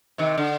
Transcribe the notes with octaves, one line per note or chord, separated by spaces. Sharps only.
C3 D#3
D3